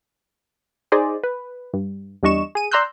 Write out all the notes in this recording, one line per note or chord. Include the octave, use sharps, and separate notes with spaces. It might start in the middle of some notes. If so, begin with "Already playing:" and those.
D#4 G#4 C5 D5 D#5
B4
G2
E2 G3 D4 D#5 C#6 E7
G#4 D#7
D5 A#5 C6 E6 F#6 G6